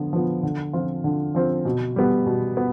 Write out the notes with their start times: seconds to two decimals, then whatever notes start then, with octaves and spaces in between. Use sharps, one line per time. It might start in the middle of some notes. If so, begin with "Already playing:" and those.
Already playing: D3 F3 B3
0.13 F3 B3
0.43 D3
0.73 F3 C4 F4
1.04 D3
1.35 F3 C4 F4
1.65 B2
1.96 G3 B3
2.26 B2
2.57 B3